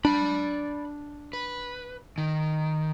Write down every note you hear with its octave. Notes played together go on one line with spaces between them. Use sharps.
D4 D5 B5
B4
D#3